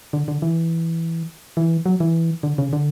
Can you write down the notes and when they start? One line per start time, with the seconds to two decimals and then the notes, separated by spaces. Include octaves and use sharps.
0.13 D3
0.28 D3
0.42 E3
1.57 E3
1.86 F#3
2.00 E3
2.43 D3
2.58 C#3
2.73 D3